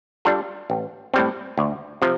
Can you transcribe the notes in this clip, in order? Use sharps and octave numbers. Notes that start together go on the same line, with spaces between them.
G3 D4 F4 A4
A1
A2 G3 C4
D2
C3 F3